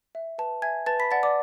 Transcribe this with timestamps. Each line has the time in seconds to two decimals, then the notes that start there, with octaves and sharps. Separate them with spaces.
0.15 E5
0.38 B4 A5
0.62 E5 G#5 G#6
0.86 B4 A5 A6
1.00 B5 B6
1.11 D5 F#5 A5 A6
1.23 D5 D6